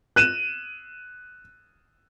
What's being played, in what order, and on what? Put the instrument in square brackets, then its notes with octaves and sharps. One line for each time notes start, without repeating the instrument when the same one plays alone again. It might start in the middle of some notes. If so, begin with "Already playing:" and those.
[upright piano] F#6 D#7 E7